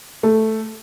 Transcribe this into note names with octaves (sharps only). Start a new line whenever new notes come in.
A3